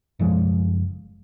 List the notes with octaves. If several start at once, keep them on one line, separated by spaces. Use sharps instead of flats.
F#1 F3 G#3